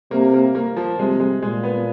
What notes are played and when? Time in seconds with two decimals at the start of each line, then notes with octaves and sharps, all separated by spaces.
0.11 C3 A#3
0.34 A#3
0.55 A#3
0.76 F3
0.99 C3 G#3
1.20 G#3
1.42 A#2 G#3
1.63 B3